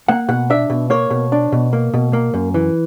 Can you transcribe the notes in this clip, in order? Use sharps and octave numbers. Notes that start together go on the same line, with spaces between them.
A#3 F#5
B2 F#5
D4 E5
B2
A#3 C#5
B2
D4
B2
A#3
B2
A#3
F#2
E3